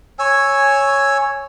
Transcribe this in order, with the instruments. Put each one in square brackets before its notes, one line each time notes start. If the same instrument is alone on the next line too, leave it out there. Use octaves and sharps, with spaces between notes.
[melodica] C#5 G#5 E6